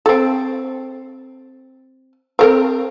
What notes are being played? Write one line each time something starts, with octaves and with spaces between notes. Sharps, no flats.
C4 A4
C4 A4 A#4